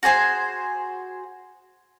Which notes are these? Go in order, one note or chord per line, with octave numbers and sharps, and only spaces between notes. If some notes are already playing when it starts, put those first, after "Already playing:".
F#4 G#4 C5 G#5